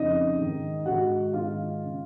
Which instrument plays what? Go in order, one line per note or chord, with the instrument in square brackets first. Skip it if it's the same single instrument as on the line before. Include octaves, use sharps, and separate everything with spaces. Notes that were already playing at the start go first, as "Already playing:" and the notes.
Already playing: [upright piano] F2 C#3 D#4 D#5
G#2 D#3
G#2 D#3 F#4 F#5
G#2 D#3 F4 F5
C#3